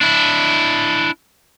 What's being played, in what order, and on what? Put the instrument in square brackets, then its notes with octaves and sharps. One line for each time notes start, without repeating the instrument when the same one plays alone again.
[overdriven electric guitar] D4 E4